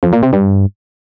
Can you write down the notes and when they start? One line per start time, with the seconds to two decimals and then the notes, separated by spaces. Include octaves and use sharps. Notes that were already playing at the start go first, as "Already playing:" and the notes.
0.03 F2
0.13 A#2
0.23 C3
0.33 G2